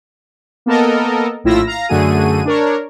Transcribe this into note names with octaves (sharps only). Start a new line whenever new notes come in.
A#3 B3 A4 A#4 D#5
A#1 A2 E4 F4 E6 A#6
F5 A#5
F#2 D3 A3 F#4 G#4 D#7
D4 A#4 C#5